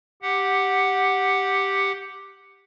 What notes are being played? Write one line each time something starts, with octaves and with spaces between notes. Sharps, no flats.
G4 F#5